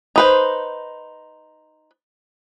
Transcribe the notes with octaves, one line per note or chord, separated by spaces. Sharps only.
D#4 B4 C5